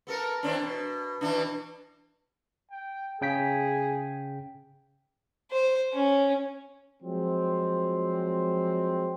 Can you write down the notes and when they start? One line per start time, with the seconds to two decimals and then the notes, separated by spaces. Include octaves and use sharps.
0.07 B3 A4 A#4
0.43 E3 C4 D4
0.61 B2
1.21 B2 E3 D4
2.71 G5
3.21 C#3 G#4 G5 B6
5.51 C5
5.94 C#4
7.02 F3 F#3 G#3 C4